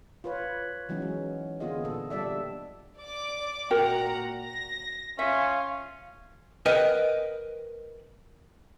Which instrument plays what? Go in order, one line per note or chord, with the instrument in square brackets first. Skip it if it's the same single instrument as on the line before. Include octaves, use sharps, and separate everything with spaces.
[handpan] F4 B4 C#5
E3 F#3 G#3 C#4 D#4
F#3
D3 A#3 B3 F4 G#4 D#5
A#2 A4
G3 D4 A4 D5 E5
[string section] D5 D6
[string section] A#2 F#5 A#5 [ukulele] F#4 A#4 G5
[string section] A#6
[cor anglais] C#4 [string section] F4 [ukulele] E5
[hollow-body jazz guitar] A#4 B4 D#5 F#5 G5